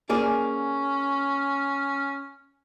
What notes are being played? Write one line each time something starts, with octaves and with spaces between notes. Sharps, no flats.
A#3 C#4 G#4 D5